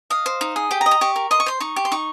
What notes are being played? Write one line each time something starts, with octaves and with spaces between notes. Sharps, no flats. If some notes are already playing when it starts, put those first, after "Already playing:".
D#5 F5
C5
D#4
G#4
G4 G5
A#5
D#5
A#5
G4 C#6
A#4
D#5 C6
C#6
C5 C6
D#4 C#6
G4
C6
D#4 C#6